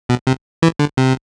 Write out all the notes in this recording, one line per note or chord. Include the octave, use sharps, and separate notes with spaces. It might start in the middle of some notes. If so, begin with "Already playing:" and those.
B2
C3
E3
D3
C3